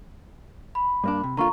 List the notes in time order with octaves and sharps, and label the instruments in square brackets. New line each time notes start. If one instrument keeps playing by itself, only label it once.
[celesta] B5
[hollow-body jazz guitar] G2 A#3 D4
C3
[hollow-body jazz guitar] D3 A#3 F4 [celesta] A#5 C#6